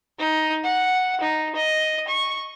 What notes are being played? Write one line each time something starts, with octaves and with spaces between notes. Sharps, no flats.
D#4
F#5
D#4
D#5
C#6